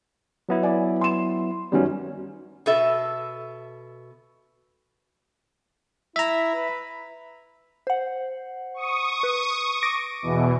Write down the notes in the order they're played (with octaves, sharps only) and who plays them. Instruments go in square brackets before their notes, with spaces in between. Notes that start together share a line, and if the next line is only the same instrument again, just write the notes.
[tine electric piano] F#3 B3 E4
[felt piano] B4 D5 G#5
C6 E7
[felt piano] F#2 D#3 F#4 [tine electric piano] G3 B3 C#4
[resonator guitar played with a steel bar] B2 A4 E5
[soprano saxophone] E4 [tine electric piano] E5 A#5
[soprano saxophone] B4
[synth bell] C5 F#5
[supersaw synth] C#6 D#6
[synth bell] B4
D6 A#6 D7
[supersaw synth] E2 B2 E3